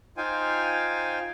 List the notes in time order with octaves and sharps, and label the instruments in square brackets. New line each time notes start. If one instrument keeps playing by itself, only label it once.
[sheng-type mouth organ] D#4 F4 C5 F5 G5 G#5